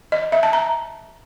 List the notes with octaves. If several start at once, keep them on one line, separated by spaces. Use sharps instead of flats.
D#5
E5
A5
A#5